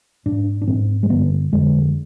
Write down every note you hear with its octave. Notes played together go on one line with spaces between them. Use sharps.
G#2 D4
D4
G#2 C4
G#3
G2 D3 B3
F2 D3 G#3